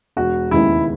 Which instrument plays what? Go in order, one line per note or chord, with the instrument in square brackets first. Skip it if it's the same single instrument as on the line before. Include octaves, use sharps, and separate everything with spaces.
[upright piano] E1 [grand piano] F#4
[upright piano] D#2 C#3 G#3 B3 [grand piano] E4